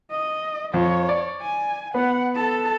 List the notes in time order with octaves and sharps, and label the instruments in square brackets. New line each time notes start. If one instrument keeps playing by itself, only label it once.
[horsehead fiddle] D#5
[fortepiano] F2 [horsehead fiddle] C#5
[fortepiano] D5
[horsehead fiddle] G#5
[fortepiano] B3 [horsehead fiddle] F#5
[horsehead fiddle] A4 A5